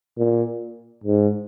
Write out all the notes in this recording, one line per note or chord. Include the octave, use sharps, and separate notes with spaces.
A#2
G#2